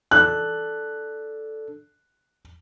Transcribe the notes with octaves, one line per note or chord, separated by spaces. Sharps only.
D4 A4 F#6